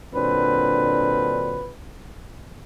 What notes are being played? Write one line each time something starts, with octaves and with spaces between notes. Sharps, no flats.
A#2 D3 F#3 C4 D4 B4